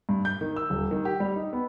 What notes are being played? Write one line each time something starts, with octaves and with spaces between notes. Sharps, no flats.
G2
G6
D#3
E6
D#1
D#3
G4
G3
D#4
B3